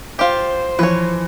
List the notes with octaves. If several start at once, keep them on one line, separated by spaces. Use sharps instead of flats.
F4 G4 C5
E3 F3 B4 C#5